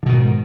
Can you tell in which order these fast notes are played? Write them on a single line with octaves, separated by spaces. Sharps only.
D3 B2 D#3 G#2